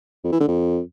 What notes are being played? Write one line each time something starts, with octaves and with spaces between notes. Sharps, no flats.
F2
E3
D3
F2